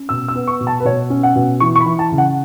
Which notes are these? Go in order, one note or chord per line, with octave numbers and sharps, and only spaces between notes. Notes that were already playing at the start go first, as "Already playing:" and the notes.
Already playing: C#4
B2 E6
E6
B3
C#6
B2
A5
B4
B2 C#5
C#4
F#5
B2
E3 C#6
C#6
B5
E3
A5
C#3
F#5